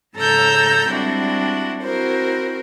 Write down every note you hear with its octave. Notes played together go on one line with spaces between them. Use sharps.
G#2 C#3 A4 A#5 E6 G6
G3 G#3 C4 D4 E4 F#4
C4 E4 F#4 A#4 C5